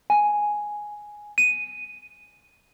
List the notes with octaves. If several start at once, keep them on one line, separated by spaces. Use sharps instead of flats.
G#5
D#7